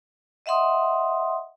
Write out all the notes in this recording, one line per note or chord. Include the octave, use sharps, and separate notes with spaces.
D#5 E5 F#5 C6 D#6